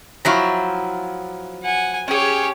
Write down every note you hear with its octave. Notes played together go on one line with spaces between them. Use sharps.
F3 F#3 E4 F5 G5 A#5
F#5 G#5
C#4 D4 G4 G#4 C#5